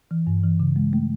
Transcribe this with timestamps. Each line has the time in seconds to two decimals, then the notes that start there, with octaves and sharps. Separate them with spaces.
0.11 E3
0.27 G2
0.43 E3
0.60 C#3
0.76 G#3
0.93 A3